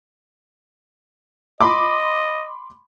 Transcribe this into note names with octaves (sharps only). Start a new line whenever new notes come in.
D#5 B5 C6 D6